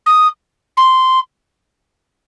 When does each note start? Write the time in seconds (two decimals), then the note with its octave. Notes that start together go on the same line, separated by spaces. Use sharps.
0.06 D#6
0.77 C6